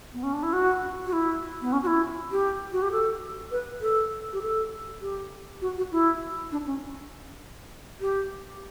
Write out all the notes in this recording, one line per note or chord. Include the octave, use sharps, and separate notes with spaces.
B3
C#4
D4
E4
F#4
F#4
E4
B3
C#4
F#4
E4
G4
F#4
G4
A4
B4
A4
G4
A4
G4
F#4
F#4
E4
D4
C#4
G4